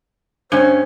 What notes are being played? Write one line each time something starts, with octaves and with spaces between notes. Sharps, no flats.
G2 C#4 C5